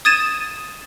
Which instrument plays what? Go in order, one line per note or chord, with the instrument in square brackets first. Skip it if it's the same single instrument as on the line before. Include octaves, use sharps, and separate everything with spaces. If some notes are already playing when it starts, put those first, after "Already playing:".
[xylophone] D#6 G#6 A6 D#7 E7